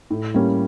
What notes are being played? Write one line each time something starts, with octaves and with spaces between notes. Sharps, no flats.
A2
G3 A#3 C#4 G4